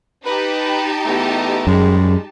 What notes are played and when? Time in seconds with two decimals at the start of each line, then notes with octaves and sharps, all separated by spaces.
0.24 D#4 G4 B4 A5
1.05 E2 A3 B3
1.67 F#2 G3 G#3 G#4